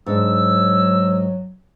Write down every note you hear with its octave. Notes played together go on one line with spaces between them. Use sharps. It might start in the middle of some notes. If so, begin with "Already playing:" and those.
G#2 F#3 D4 E6